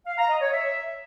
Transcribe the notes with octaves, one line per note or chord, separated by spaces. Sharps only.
F5
A#5
D#5
C#5
E5